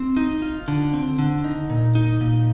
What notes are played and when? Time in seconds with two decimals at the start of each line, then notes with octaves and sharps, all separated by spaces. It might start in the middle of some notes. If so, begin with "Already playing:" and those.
Already playing: C4
0.17 D#4
0.42 F4
0.68 D3
0.93 C4
1.19 D3
1.44 D#4
1.70 A#2
1.95 D#4
2.21 A#2